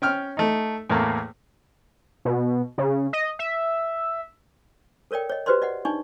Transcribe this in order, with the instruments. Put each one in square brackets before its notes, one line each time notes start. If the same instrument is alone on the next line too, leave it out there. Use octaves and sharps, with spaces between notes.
[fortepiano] C#4 G5 F6
A3 D#4
E2 A2 A3 A#3
[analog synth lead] B2
C#3
D#5
E5
[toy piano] A4 A#4 C#5 D5 G5
C#5 D#5
F#4 G4 B4 C5 D5 C6
D5 D#5 F#5
D4 D#4 D5 G#5 C#6